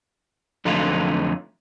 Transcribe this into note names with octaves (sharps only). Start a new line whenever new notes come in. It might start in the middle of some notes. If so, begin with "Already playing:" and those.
F2 D3 F#3 A3 D#4 F4